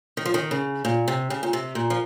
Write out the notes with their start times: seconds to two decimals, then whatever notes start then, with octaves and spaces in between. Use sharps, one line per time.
0.17 D#3
0.25 F3
0.34 D#3
0.51 C#3
0.85 A#2
1.08 C3
1.30 C#3
1.43 A#2
1.53 C3
1.75 A#2
1.90 F3